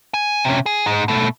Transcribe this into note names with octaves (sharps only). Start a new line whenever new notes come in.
G#5
C3 C#4
G#4
G#2 G#3
B2 A3